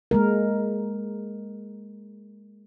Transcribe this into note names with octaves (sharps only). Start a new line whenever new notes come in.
G#3 A#3 A#4